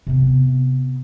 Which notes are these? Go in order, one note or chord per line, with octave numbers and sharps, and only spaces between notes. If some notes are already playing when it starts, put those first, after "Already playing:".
C3 B3